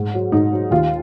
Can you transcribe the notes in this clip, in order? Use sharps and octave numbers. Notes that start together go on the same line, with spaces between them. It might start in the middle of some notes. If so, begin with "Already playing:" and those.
Already playing: G#2
F#3
G#2 D#4
F#3
D#2 F4